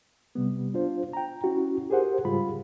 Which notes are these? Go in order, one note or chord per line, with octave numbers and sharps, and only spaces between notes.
C3 G3 B3
D4 F4 C5
G5 A#5
C#4 E4 F#4
G4 G#4 A#4 C5 F#5
G#2 C#3 G3 F4 G#4 B5